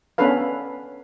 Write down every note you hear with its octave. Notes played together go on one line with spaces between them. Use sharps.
B3 C#4 D4 A4 B4 F5